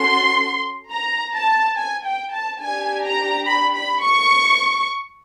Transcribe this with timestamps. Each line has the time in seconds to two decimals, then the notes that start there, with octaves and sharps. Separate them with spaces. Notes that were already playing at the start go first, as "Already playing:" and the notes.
Already playing: C#4 F#4 A4 C6
0.91 A#5
1.33 A5
1.76 G#5
2.04 G5
2.33 A5
2.61 D4 G4 G#5
3.04 A#5
3.46 B5
3.75 B5
4.03 C#6